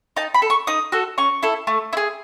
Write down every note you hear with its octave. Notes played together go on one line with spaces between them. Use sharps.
D#4 A5
B5
A4
C#6
D#4 D#6
F#4 A4
C#4 C#6
E4 A4
A3
E4
G#4